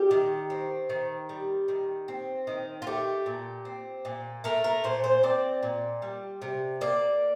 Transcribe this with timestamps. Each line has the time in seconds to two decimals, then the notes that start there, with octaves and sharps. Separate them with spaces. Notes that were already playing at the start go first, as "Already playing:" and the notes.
Already playing: G3 G4
0.11 D#3
0.50 C4
0.89 D#3
1.29 G3
1.68 D#3
2.08 C4
2.47 D#3
2.82 F4
2.87 A3 G4
3.26 A#2
3.65 C4
4.05 A#2
4.44 A3 A#4
4.64 A#4
4.84 A#2 C5
5.04 C5
5.23 C4 D5
5.63 A#2
6.02 G3
6.42 C3
6.81 A#3 D5